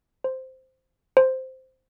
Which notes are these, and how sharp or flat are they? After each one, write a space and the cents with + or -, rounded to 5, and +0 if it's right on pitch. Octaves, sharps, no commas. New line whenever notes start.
C5 -5
C5 -5